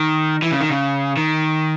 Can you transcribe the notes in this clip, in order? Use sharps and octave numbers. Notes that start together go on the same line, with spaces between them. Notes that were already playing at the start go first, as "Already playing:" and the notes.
Already playing: D#3
E3
C#3
D#3
C#3
D#3